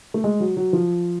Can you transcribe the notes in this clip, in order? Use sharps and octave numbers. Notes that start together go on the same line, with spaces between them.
A3
G#3
F#3
F#3
F3